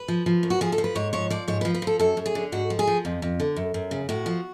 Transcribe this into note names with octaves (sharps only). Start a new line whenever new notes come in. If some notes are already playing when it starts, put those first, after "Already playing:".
Already playing: B4
F3
F3
F#2
F#4
F3 G#4
A4
F3
B4
G#2 C#5
F3 C#5
F3 D5
G#2 C#5
F3 B4
B4
F3
A4
F#2 A4
F#2
G#4
D3
G#2 F#4
F3
G#4
F3
F2
F2
D3
F#2
F#2
C#3
A2 F#4
F3